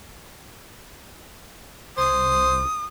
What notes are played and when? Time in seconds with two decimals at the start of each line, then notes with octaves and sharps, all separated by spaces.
1.97 C2 C5 D#6